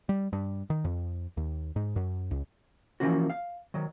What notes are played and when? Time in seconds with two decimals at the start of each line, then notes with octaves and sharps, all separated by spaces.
0.09 G3
0.33 G2
0.70 D#3
0.84 F2
1.37 D#2
1.76 G#2
1.96 F#2
2.31 C#2
3.00 E3 F3 A#3 C#4 F#4
3.30 F5
3.74 D#3 F#3